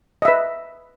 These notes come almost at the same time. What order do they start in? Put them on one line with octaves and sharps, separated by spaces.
D#5 E5 B4